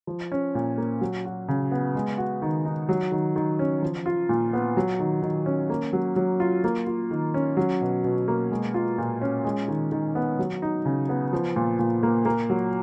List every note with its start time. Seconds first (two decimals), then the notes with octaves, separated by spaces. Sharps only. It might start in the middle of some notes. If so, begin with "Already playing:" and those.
0.07 F3
0.32 C#4
0.55 A#2
0.78 A#3
1.01 F#3
1.25 F#4
1.48 C#3
1.72 B3
1.95 G#3
2.18 F#4
2.42 D#3
2.66 D#4
2.89 F#3
3.12 D#3
3.36 D#3
3.59 C#4
3.82 F3
4.06 F4
4.29 A#2
4.53 B3
4.77 F#3
4.99 D#3
5.22 D#3
5.46 C#4
5.70 A#3
5.93 F#3
6.16 F#3
6.40 F4
6.64 A#3
6.87 F4
7.11 D#3
7.34 C#4
7.57 F#3
7.81 B2
8.04 B2
8.28 A#3
8.51 G#3
8.74 F4
8.98 A#2
9.21 C#4
9.44 G#3
9.68 D#3
9.92 D#3
10.15 B3
10.39 F#3
10.62 D#4
10.85 C#3
11.09 B3
11.33 F3
11.56 A#2
11.79 A#2
12.03 A#3
12.25 A#3
12.50 F#3